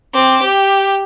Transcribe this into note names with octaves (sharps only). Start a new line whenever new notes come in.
C4 D6
G4